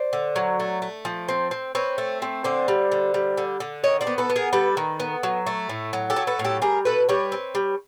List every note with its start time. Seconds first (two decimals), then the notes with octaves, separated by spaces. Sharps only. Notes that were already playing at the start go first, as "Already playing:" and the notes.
Already playing: C5 D5
0.13 D3
0.36 F#3
0.60 A3
0.82 A3
1.05 F3
1.29 C4
1.51 C4
1.75 C4 B4 C#5
1.98 A3
2.22 C4
2.44 D3 C5 D5
2.68 G3
2.92 D3
3.14 G3
3.38 D3
3.60 D3
3.84 D#3 C#5 D#5
4.01 C5 D5
4.07 B3
4.18 A4 B4
4.30 B3
4.36 G#4 A#4
4.53 G3 A4 B4
4.77 D#3
5.00 B3
5.23 F#3
5.47 A3
5.69 A2
5.93 F#3
6.10 G4 A4
6.16 F#3
6.27 A4 B4
6.39 A2
6.44 G4 A4
6.62 G3 G#4 A#4
6.85 B2 A4 B4
7.09 G3 B4 C#5
7.32 C4
7.55 G3